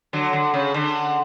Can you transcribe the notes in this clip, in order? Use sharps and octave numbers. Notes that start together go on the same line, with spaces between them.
D3 F#3
D3
C#3
D3